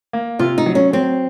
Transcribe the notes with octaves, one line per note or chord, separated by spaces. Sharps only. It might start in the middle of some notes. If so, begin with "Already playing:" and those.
A#3
C3 F4
D#4
F#3
C#4
F#3 C4